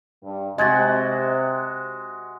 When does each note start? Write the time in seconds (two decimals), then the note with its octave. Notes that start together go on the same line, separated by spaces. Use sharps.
0.23 G2
0.58 C3 G#3 F#4 D#5 G#6 A6